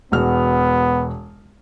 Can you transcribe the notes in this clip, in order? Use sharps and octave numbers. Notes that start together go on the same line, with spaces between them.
E1 B3 F#4 F6